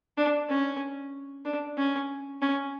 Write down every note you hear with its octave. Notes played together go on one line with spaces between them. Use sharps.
D4
C#4
D4
C#4
C#4